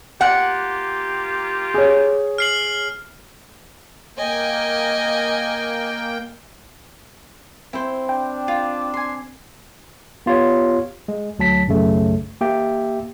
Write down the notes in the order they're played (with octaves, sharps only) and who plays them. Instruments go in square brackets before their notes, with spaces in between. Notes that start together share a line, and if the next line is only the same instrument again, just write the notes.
[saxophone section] A#3 F4 G4 [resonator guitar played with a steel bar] F#5
[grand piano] G#4 C#5
[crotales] F6 C7 F#7
[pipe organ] A#3 G5 [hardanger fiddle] D#5 G#5
[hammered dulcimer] C4 [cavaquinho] E4 C5
[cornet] D4 [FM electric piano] G5
[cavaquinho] F4
G#5 C6
[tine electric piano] B3 F4 G4 C#5
G#3
D2 F#3 A5 B6
B1 F#2 C#3 A3
A#3 G4 E5 G5